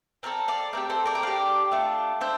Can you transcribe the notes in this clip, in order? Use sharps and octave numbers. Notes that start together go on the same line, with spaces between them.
C4 F4 A4 A#4 D5
D5 F5
A3 C4 G4 A#4
A4 C5
A#4 D5
G5
D4 G4 D5 F5
A3 D4 F4
D4 C5 E5